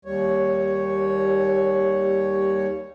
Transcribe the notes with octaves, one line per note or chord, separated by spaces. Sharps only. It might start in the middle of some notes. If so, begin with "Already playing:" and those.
D#2 G3 C#5